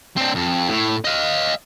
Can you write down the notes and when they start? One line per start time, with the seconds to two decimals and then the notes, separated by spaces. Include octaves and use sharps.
0.16 C4 D4
0.35 F2
0.68 A2
1.05 D#5 F5